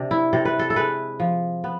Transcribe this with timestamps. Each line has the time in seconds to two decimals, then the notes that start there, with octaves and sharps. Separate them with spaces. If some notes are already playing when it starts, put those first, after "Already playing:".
Already playing: C3 D4
0.11 E4
0.33 C3 A4
0.45 B4
0.59 A4
0.70 A4
0.76 G#3 B4
1.20 F3
1.64 B3